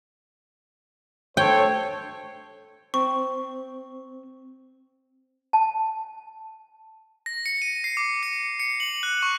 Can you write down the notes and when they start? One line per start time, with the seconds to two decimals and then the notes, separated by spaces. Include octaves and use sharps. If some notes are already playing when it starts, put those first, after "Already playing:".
1.37 A4 C5 C#5 G5
2.94 C4 C#6
5.53 A5
7.26 A#6
7.46 C#7
7.62 D#7
7.84 C7
7.97 D6
8.23 C#7
8.60 C#7
8.80 F#7
9.03 F#6
9.23 C#6